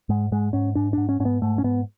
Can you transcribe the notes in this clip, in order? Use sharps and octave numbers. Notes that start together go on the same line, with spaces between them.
G#2 G#3
G#2 G#3
G#2 C#4
G#2 D4
G#2 D4
C#4
G#2 C#4
B3
G#2 A3
C#4
G#2 B3